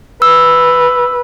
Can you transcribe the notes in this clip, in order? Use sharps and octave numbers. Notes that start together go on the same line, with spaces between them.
B4 E6